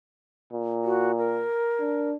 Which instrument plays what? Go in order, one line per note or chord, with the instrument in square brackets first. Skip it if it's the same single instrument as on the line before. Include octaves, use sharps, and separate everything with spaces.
[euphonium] A#2
[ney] F#4
A#4
[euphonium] D4